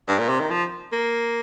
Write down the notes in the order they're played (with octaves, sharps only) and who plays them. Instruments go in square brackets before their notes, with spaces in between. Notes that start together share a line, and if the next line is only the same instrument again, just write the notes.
[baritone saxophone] G2
A#2
C3
D#3
F3
A#3